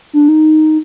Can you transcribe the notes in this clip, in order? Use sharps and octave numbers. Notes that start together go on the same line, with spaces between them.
D4
D#4